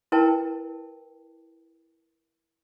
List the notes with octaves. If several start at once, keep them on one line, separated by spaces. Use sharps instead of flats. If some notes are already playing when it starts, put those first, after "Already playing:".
E4 A#4 B4 G5 A5